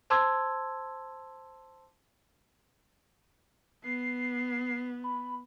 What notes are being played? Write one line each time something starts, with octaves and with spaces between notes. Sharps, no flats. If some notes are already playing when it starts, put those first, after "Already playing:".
C5 A5 C6 D6 E6 G#6
B3 C7
B5